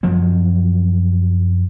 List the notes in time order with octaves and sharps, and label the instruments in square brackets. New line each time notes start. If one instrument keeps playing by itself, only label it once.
[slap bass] F#2 F3 F#3 C4